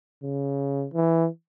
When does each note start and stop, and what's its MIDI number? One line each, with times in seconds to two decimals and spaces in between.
0.23 0.86 49
0.94 1.27 52